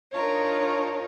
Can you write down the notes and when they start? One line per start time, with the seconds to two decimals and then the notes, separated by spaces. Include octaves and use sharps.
0.13 D4 D#4 F4 A#4 C#5